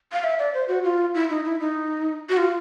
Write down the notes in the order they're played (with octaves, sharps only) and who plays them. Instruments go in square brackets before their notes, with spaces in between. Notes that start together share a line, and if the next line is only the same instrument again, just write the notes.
[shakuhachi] F5
E5
D5
C5
F#4
F4
E4
D#4
E4
D#4
F#4
F4